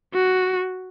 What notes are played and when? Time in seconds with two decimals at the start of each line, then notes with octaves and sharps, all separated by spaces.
0.14 F#4